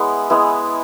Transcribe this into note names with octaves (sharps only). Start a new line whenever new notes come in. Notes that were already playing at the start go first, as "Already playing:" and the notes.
Already playing: G#3 B3 E4 B5
G#3 B3 E4